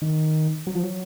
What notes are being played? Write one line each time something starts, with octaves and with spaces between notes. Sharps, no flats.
D#3
F#3
F3
F#3